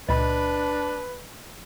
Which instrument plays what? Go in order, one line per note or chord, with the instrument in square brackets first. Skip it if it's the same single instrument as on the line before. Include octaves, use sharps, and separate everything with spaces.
[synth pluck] C#2 A#2 [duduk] D4 [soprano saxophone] B4 [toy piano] D#5 B5